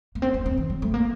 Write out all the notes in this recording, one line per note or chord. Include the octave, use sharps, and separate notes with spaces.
A#3
C4
A#3
C4
D#3
F#3
A3
A#3